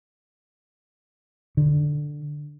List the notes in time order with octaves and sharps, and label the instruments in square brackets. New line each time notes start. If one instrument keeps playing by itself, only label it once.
[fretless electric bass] D3